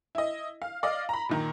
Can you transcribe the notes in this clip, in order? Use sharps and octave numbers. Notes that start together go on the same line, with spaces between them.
E4 D#5
F5
D5 D#5 F5
A#5 B5
A#2 D#3 A#5